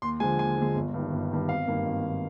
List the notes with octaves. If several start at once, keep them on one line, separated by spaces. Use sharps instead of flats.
D#2 C6
D3 F3 G#3 G#5
D#2 G#5
D3 F3 G#3
G1
G2 D#3
G1
G2 D#3
G#1 F5
G2 D#3 A#3
G#1
D#3 A#3